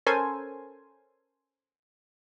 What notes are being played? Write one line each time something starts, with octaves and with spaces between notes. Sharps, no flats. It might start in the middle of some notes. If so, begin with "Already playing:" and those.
C#4 A4 A#4 C5 G#5